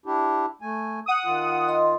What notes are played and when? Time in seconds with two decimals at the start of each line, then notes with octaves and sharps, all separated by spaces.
0.06 D4 E4 G4
0.61 A3 G#5
1.06 F#5 D#6
1.25 D#3 F4
1.67 D#5 C6